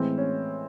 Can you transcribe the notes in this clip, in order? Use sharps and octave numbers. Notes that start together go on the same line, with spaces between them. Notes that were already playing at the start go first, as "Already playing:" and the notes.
Already playing: A2 E3 G#3 C4
C#4